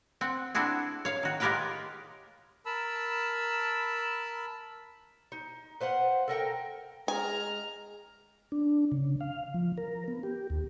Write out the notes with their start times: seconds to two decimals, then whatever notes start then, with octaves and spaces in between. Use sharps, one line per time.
0.21 C4 F#5
0.55 C4 D4 E4 F#4 G#4
1.05 C#5 F5
1.23 D#3 F#4
1.40 G#3 F4 G4 A#4 B4 G5
2.66 A#4 A5 B5 E6
5.32 D#4
5.80 B4 C5 F5 F#5
6.28 A4 A#4 F#5 G5
7.08 G#3 G#5 A#5 F6
8.52 D4
8.92 C#3
9.21 F5
9.54 F3
9.77 A#4
10.08 B3
10.23 G4
10.50 D#2